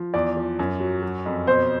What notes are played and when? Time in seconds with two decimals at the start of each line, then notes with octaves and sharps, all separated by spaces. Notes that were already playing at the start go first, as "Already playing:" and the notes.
Already playing: F3
0.14 E2 D5
0.37 F3
0.59 F#2
0.80 F#3
1.03 F#3
1.26 F2
1.47 B2 C5